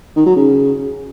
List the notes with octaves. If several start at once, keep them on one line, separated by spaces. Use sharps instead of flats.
D#3
F#3
C#3